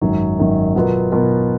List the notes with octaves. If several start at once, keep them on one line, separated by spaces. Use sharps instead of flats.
G#1 F#2 D#3 F#3
G#1 F#2 D#3 F#3
B2 F#3 B3 F4 A#4
B2 F#3 B3 F4 A#4